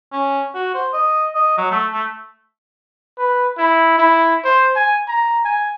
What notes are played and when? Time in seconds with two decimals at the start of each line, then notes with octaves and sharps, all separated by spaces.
0.12 C#4
0.55 F#4
0.75 C5
0.93 D#5
1.35 D#5
1.58 F#3
1.71 A3
1.93 A3
3.18 B4
3.58 E4
3.98 E4
4.45 C5
4.76 G#5
5.08 A#5
5.45 G#5